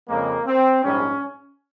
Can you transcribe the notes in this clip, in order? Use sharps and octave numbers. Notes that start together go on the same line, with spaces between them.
F2 C#3 G#3 A#3
C4
A#1 G#2 G3 C#4